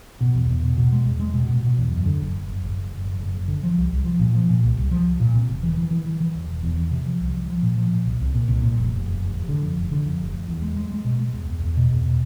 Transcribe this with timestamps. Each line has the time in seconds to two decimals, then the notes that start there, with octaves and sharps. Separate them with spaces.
0.21 B2
0.34 E2
0.49 E2
0.63 B2
0.78 B2
0.92 G#3
1.05 E2
1.20 G#3
1.34 B2
1.48 B2
1.63 B2
1.78 E2
1.92 F#2
2.05 D3
2.20 F#1
2.34 F#1
2.48 F#1
2.63 F#1
2.77 F#1
2.91 F#1
3.05 F#1
3.19 F#1
3.34 F#1
3.48 D3
3.63 F3
3.78 C2
3.92 C2
4.05 F3
4.19 A#2
4.35 F3
4.49 A#2
4.63 C2
4.77 C2
4.91 F3
5.05 C2
5.20 A#2
5.34 C3
5.48 E1
5.63 E3
5.77 E3
5.91 E3
6.05 E3
6.20 E3
6.35 E2
6.48 E1
6.63 E2
6.77 E3
6.91 C3
7.05 F3
7.20 C2
7.34 F3
7.48 F3
7.62 A#2
7.77 F3
7.91 A#2
8.06 C2
8.20 C2
8.34 A#2
8.48 C2
8.62 A#2
8.77 F1
8.92 F1
9.06 F1
9.20 F1
9.34 F1
9.49 D3
9.62 F2
9.77 F1
9.91 D3
10.06 F2
10.19 F1
10.33 F2
10.48 E2
10.62 G#3
10.76 G#3
10.91 G#3
11.05 B2
11.19 G#3
11.34 E2
11.48 E2
11.63 E2
11.77 B2
11.91 E2
12.05 B2